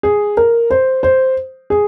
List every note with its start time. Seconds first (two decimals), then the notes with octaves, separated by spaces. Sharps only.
0.03 G#4
0.37 A#4
0.70 C5
1.03 C5
1.70 G#4